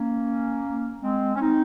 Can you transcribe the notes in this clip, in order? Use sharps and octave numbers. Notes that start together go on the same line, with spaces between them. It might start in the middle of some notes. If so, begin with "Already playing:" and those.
Already playing: A#3 C#4
G#3 C4
C#4
C4 D#4